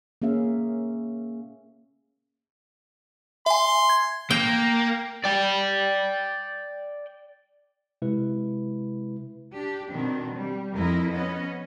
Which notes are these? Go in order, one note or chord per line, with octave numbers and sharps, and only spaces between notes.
A#3 C#4 G#4 E5 F5
E5 G#5 C6
G#6
A#3 G5
D5 G5
C3 G#3 E4 B4
D4 G4
B2 D#3 C4 D4
G3
F2 E4 A#4 D#5
B3 C#4 D#5